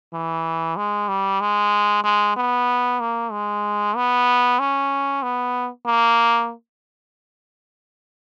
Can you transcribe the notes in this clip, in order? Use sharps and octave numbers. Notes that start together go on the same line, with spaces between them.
E3
G#3
G3
G#3
G#3
B3
A#3
G#3
B3
C#4
B3
A#3